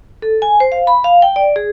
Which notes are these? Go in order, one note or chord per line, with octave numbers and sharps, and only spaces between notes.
A4
G#5
C5
F5
B5
F5
G5
D5
G#4